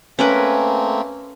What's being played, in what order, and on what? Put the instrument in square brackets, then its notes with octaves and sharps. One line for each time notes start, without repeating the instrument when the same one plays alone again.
[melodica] A3 A#3 C4 [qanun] C#4 A#4 B4